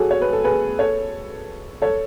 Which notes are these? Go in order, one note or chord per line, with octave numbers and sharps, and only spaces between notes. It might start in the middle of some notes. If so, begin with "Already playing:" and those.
Already playing: F#4 G#4 A4 C#5
C#5
B4
A4
G#4 B4
A4 C#5
A4 C#5